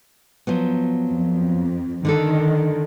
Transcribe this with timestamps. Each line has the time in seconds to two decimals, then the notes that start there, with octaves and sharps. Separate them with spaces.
0.47 F3 F#3 B3
1.10 F2
2.05 D3 D#3 D4 A4